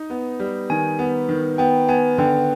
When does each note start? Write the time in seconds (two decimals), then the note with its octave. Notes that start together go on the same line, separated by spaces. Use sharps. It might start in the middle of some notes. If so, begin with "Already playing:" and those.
Already playing: D#4
0.10 B3
0.40 G3
0.70 D#3 G#5
0.99 B3
1.29 D#3
1.58 B3 G5
1.88 B3 G#5
2.18 D3 G5